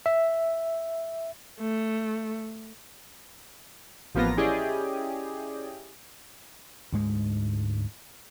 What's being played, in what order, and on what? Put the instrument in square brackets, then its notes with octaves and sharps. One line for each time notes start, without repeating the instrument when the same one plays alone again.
[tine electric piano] E5
[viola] A3
[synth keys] A1 F3 A#3 B3 F4 A#6
C#4 E4 G4 G#4 D5 D#5
[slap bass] D2 G#2 G#3